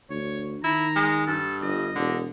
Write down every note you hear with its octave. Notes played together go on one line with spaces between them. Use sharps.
D2 C#5
D#3 E4 A#5
G#3
G2 A4
G1 D#5
E1 D3